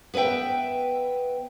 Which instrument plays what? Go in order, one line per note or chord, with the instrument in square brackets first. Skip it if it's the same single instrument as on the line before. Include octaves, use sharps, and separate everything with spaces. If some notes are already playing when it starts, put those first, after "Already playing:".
[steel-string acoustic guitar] B3 B4 C5 E5 G5